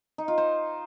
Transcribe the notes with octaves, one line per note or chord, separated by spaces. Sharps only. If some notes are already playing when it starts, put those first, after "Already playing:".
D#4
F4
C5